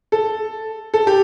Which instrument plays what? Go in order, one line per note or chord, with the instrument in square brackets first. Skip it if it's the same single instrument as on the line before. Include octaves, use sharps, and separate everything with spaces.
[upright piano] A4
A4
G4